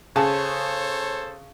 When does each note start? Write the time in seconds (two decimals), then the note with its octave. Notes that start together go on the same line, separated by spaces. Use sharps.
0.16 C#3 G#4 A4 C5 C#5 A5